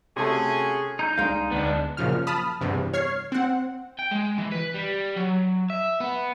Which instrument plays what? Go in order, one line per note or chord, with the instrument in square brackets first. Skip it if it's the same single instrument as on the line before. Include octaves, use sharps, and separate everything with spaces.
[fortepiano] C3 A3 A4 [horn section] C#4 F#4 G#4
[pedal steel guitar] D#4 A#5 G6
[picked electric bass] C2 D4 [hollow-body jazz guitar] G#3 F5
[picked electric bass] D2 [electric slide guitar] B3 D4
[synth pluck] F#2 A#2 C#3 F3 F6
A5 B5 D#6 F6
E2 G2 C3
C#5 F6 G#6 C7
C4 F#5
[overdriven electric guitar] G5
G#3
E3
B4
G3
F#3
E5
B3